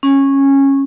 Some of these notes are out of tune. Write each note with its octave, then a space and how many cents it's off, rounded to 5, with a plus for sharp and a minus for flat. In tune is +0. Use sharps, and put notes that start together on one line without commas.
C#4 -15